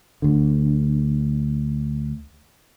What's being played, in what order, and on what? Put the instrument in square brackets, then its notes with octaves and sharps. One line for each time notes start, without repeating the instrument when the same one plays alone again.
[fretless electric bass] D2 D3